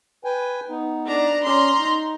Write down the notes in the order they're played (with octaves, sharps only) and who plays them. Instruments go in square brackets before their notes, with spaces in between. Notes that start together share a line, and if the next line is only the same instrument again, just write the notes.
[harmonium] B4 G5 G#5
B3 D#4
[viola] D4 A#5
[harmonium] C#4 [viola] A#5 C6
[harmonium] D#4